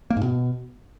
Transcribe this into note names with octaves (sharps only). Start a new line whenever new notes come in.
A#3
G#2
B2